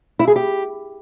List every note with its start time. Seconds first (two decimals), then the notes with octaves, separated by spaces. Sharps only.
0.19 E4
0.28 G#4
0.36 G4